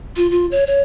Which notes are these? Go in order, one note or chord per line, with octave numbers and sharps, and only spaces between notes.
F4
F4
C#5
C#5